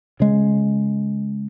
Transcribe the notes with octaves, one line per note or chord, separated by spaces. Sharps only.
C#3 G#3